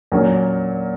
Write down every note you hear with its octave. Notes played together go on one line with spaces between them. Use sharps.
A#2 F#3 A#3 C#4